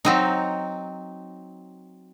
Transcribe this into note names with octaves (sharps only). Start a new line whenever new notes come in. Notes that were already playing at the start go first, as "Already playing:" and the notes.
F#3 C4 D#4